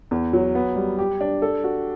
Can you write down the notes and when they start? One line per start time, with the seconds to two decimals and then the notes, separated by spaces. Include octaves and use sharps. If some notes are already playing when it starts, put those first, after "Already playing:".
0.11 E2
0.33 F#3
0.55 B3
0.76 G3
0.99 G4
1.21 D4
1.42 A4
1.64 F#4